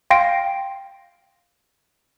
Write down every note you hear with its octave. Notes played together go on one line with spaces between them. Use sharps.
F5 G5 C6 A#6 C7 D7